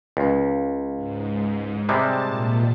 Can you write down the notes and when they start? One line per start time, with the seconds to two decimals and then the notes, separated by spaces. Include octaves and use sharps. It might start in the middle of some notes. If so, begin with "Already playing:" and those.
0.17 C#2
0.96 G#2
1.89 C3 G3 G#3 A5
2.24 A#2